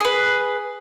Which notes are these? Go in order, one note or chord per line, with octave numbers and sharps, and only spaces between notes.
G#4 B4